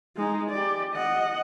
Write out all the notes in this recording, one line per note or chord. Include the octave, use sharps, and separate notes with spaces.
G#3 D#4
G4 D5
D#5 F#5